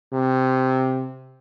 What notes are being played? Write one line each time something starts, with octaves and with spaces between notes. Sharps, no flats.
C3